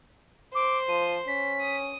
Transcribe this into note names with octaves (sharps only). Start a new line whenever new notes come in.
C5 D6
F3 D#7
C#4 B6
D#6